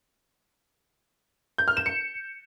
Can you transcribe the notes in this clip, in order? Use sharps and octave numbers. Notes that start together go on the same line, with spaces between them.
G6
F6
E7
C#7